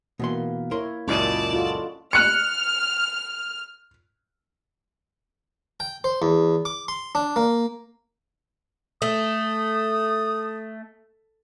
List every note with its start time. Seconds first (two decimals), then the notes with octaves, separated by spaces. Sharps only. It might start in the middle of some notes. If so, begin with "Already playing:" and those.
0.20 B2 E3 A#3 C6
0.71 E4 A#4 C#5 C6
1.08 C#2 F#2 A#2 C#4 E4 D5 D#5 A5
1.53 F4 F#4 A4
2.13 F6 F#6 C#7
5.80 G5
6.04 C5
6.22 E2
6.65 D6
6.88 C6
7.15 D4
7.36 A#3
9.02 A3 D#6